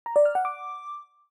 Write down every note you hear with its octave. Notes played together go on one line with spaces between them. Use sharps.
A#5
D5
F6
F#5
D6